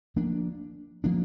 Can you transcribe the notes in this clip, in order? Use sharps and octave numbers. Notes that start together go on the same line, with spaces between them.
F3 A#3 D4
F3 A#3 D4